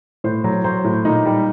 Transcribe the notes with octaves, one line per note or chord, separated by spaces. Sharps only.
A2 C5
F#3
F#3 C5
A2
A#2 D#4
G3